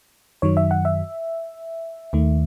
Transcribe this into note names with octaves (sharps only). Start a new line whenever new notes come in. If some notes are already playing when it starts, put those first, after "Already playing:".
F#2 D#3 F#3 C#5
E5
F#5
E5
D#2 D#3 A3